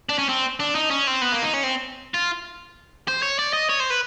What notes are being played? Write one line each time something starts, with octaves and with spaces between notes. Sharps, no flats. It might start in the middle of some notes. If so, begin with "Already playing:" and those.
D4
C#4
C4
D4
D#4
C#4
C4
B3
A#3
D#4
C#4
C4
F4
C5
C#5
D5
D#5
C#5
C5
B4